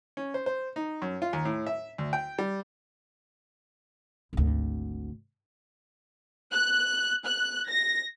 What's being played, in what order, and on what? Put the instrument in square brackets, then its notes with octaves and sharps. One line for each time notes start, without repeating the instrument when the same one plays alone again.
[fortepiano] C#4
C5
C5
D#4
F#2
F4
D#2
A2
E5
D2
G5
G3
[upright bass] G#1 D2
[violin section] F#6
F#6
A#6